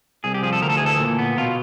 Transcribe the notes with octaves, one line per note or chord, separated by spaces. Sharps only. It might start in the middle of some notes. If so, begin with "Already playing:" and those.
C2 G#4
G4
F3 G#4
A4
D2 A#4
A4
G#4
E3
A4
A#2
B3
B2 F4